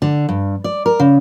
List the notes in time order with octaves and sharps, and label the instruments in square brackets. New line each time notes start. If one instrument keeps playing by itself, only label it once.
[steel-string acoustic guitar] D3
G2
D5
A#4
C#3